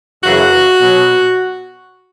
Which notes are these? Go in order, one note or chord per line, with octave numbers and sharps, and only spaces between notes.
F#2 C#3 E3 F#4
B2 F#3